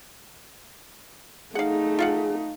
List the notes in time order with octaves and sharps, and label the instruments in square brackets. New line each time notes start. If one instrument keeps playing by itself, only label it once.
[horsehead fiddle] A3 D#4 [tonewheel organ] G#4 [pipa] F5 F#5
[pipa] F4 F5 F#5